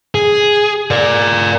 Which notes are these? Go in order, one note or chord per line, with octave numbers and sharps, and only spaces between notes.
G#4
A#4 D5